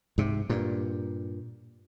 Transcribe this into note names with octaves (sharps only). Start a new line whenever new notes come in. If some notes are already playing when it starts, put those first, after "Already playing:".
G#2 C3
G2 A#2